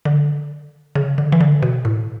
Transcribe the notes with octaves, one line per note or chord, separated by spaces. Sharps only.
D3
C#3
D3
E3
D3
B2
A2